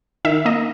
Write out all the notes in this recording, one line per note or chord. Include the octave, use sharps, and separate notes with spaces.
D#3 E5
A#3 D#5